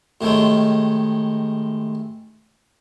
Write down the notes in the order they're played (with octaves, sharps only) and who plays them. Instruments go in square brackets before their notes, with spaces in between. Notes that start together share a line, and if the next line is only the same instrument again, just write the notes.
[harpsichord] A2 C3 D#3 G#3